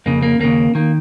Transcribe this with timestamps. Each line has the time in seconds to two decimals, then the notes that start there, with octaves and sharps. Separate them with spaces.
0.06 F2 C#3 A#3
0.23 A#3
0.40 D#2 C#3 A#3
0.75 D#3 A#3